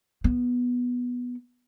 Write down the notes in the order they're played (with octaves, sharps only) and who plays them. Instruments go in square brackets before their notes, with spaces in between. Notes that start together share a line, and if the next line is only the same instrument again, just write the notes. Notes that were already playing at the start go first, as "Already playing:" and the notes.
[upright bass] B3